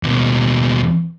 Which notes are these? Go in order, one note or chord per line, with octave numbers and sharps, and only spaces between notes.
D#2 B2